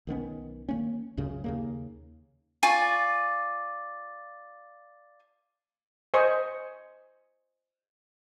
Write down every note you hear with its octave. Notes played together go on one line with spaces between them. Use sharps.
B1 D#3 B3 C#4
D#3 A#3 C#4
C#2 F#2 C#3
D#2 C#3 A#3
F4 D5 G#5 C#6
C5 D#5 G#5 C#6